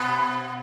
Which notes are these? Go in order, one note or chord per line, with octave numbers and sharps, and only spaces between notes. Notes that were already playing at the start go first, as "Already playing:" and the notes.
Already playing: B2 B3